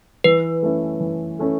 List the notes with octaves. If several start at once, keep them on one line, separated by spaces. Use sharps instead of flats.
E3 B4
A3 C#4 E4 A4
E3
A3 C#4 E4 A4